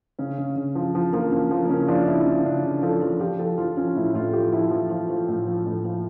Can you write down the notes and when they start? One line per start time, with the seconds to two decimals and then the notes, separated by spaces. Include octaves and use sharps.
0.19 C#3 C#4
0.38 C#3
0.56 C#3
0.75 F3
0.95 F3
1.13 F3 A#3
1.32 F3 C#4
1.51 F3 A#3
1.65 A#3
1.69 C#3 C#4
1.88 F3 D4
2.08 C#3 E4
2.26 C#3 C#4
2.45 C#3 D4
2.64 C#3
2.82 F3 A4
3.02 F3
3.20 F3 G4
3.39 F3 A4
3.58 F3 F4
3.77 F3 C#4
3.96 A2 E4
4.14 A2 F4
4.29 A4
4.33 F3 G4
4.53 F3 E4
4.71 F3
4.90 F3
5.09 F3
5.28 A2
5.47 F3
5.66 A2
5.85 F3